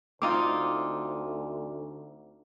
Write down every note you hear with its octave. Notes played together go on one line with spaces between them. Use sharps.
D2 C4 D#4 F4 D6